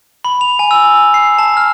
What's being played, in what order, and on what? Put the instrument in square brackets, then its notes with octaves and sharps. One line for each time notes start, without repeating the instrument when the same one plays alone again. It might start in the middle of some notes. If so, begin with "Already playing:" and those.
[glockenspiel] B5
F7
G#5
E6
C7
A5
F6